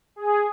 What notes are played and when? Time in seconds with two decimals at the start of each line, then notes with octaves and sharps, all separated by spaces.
0.16 G#4